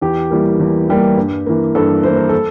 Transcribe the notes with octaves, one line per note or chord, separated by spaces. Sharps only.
E2 G4
E3 G3 A#3
E2
E3 G3 A#3
G2
E3 A#3
G2 A4
E3 A#3 C5
A#4
A4